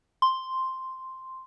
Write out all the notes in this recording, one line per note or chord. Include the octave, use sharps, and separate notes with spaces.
C6